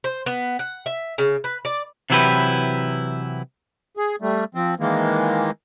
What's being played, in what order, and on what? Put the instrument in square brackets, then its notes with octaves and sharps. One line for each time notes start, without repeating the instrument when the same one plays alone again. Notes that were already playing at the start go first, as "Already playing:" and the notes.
[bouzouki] C5
B3
F#5
E5
C#3
B4
D5
[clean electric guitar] C3 E3 F#3 E4 G4 B4
[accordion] G#4
G3 A3
F3 C4
D#3 E3 G#3 A#3